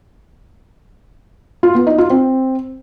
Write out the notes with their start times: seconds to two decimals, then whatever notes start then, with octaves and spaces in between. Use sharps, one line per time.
1.63 F4
1.75 B3
1.87 D#4
1.98 F4
2.10 C4